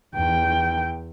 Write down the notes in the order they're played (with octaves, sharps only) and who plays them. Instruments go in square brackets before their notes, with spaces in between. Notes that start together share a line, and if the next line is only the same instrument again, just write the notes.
[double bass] E2 [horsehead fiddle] G5